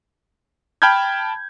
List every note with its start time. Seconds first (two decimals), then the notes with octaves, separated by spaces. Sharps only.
0.82 G5 A5 B5 F6 G6 G#6